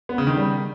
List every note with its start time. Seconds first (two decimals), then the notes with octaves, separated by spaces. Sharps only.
0.09 B3
0.18 C#3
0.27 D#3
0.36 G3